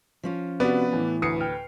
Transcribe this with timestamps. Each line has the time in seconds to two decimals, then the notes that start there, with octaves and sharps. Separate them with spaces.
0.23 F3 C#4 F4
0.60 C3 B3 F#4 B4 D5
0.92 A2 E3
1.22 D2 B4 D#6 C7 C#7
1.41 G5 F6